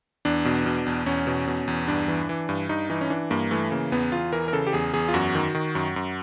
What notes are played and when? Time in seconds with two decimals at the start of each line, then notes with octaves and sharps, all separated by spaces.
0.25 E2 D4
0.45 B2
0.66 B2
0.86 E2
1.06 E2 C#4
1.27 B2
1.47 B2
1.68 E2
1.88 G2 D4
2.08 E3
2.29 E3
2.49 G2
2.69 G2 D#4
2.90 E3 D#4
3.01 C#4
3.10 E3 D4
3.30 G2 A#3
3.51 E3 A3
3.71 C#3 A#3
3.92 E2 B3
4.12 E2 F4
4.33 E3 A#4
4.48 A#4
4.53 C#3 A4
4.67 G4
4.73 E2 G#4
4.94 E2 G#4
5.08 F4
5.14 F#2 F#4
5.35 D#3
5.55 D#3
5.75 F#2
5.96 F#2